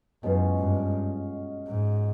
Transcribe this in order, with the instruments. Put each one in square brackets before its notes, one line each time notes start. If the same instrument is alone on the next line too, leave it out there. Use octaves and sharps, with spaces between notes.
[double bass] F#2 [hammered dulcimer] B2 G#3 C#4 F4
[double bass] G2
G#2